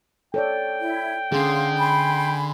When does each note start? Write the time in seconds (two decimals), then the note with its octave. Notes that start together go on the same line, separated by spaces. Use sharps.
0.34 A4 C#5 D5 G5
0.80 E4
1.32 D3 C#4 G#4 F5 C6
1.78 G#5 B5 C6